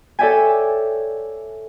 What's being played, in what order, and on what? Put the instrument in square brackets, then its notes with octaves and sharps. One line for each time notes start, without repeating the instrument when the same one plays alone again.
[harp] A4 C#5 D5 E5 G5 G#5